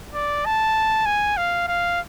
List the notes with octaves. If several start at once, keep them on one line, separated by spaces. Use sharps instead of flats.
D5
A5
G#5
F5
F5